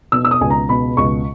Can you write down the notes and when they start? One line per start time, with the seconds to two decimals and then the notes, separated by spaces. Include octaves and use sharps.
0.12 B2 E6
0.25 E6
0.31 D#6
0.41 C#2 G#5
0.50 A#5
0.69 B2 B5
0.97 C#2 C#6